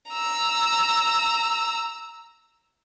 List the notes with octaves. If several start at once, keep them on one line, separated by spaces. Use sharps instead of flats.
A#5 E6